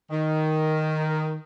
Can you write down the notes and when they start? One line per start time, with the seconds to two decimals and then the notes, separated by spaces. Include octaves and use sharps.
0.11 D#3